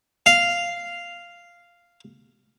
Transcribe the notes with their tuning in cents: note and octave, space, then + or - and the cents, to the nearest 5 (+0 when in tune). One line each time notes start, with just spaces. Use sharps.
F5 -5